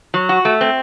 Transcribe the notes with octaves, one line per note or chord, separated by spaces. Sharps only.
F#3
F#4
A3
C4